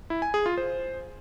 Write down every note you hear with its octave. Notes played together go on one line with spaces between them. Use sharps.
E4
G#5
G#4
F4
C5